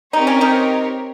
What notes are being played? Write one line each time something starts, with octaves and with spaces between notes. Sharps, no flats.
C4 D#4 G4 A#4 C#5
C#4
D#3 D#4